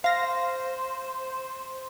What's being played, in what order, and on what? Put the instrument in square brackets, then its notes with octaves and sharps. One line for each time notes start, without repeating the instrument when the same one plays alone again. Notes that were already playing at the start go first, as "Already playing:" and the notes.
[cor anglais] C5 [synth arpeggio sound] F5 A#6